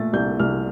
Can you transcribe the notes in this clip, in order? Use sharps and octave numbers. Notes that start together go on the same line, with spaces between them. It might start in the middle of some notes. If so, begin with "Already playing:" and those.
Already playing: A#2 A3 A6
C2 G6
C2 F6